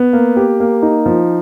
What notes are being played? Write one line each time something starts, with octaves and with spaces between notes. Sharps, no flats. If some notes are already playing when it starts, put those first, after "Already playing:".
Already playing: B3
A#3
G4
A#3
D#4
F3